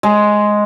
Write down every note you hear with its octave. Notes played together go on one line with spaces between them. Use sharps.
G#3